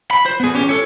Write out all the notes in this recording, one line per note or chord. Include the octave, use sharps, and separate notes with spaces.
B5
C5
B3 G#4
C#4 G4
A4 C#5